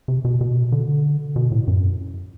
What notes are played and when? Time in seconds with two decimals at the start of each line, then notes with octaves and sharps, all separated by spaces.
0.08 C3
0.25 B2
0.41 B2
0.72 D3
1.36 B2
1.52 A2
1.67 F#2